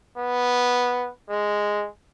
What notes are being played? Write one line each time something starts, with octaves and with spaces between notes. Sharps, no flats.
B3
G#3